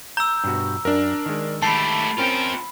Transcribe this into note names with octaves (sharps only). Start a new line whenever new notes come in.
A#5 E6 G6
G2 B2 F#4
F#2 D4 A#4
D#3 G#3
A3 G4 A5 B5 C7
C4 C#4 F4 A#4 G5